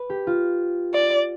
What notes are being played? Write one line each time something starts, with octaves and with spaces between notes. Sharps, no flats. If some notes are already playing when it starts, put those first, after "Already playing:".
Already playing: B4
G4
F4
D5